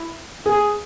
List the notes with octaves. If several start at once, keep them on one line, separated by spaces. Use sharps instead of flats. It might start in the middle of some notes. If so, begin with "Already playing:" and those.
Already playing: E4
G#4